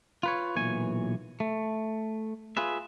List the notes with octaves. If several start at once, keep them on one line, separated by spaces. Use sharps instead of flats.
F4 B4 C#5
B1 A#2 E3 C#5 G#5
A3
F4 G#4 B4 E5